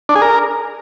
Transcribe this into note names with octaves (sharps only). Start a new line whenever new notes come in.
D4
G#4
A#4